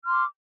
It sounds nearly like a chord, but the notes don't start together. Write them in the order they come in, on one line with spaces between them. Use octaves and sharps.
F6 C6 D6